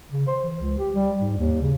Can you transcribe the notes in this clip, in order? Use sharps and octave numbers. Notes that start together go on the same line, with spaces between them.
C#3
C5
E3
C#2
G4
G3
G#2
D#2
C#3